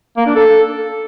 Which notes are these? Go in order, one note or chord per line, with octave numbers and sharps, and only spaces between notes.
A#3
D4
A4